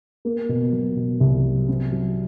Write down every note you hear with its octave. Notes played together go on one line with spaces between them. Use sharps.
A#3
B2
F#3
B2
C2
F#3
C4
F#3